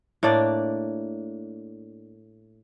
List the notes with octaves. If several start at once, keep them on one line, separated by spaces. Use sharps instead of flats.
A2 A#3 D4 D5